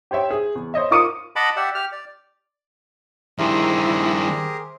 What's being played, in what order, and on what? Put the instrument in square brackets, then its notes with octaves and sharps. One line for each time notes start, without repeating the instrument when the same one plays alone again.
[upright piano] G4 C5 C#5 E5 G5
G#4
E2
C5 C#5 D#5 E5
F4 A#4 D6 D#6 C#7 D#7
[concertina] D#5 F#5 A5 B5 D6
G4 D5 E5 F#5
G4 F6
D5
[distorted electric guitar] G2 D#3 [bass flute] E4 [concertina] G4 G#4 A#4 [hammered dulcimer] C5 E5